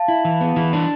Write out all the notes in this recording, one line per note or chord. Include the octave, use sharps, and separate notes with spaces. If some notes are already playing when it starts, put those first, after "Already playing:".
Already playing: F5 A5
E4
E3
B3
E3
D4